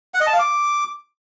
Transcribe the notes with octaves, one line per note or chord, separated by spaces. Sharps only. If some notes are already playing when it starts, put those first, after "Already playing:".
F#5
D#5
A5
F5
D6